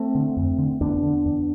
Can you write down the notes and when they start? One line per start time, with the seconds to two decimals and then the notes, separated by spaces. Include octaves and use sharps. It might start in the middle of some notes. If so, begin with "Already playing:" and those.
Already playing: A3 C4
0.15 D3
0.37 F2
0.58 D3
0.81 E2 B3 D4
1.03 D3
1.25 E2